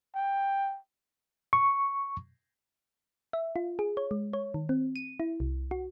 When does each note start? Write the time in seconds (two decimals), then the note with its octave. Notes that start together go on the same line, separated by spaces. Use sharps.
0.15 G5
1.53 C#6
3.33 E5
3.56 F4
3.79 G#4
3.97 C#5
4.11 G#3
4.33 C#5
4.54 D#3
4.69 C4
4.96 D#7
5.20 E4
5.40 C2
5.71 F#4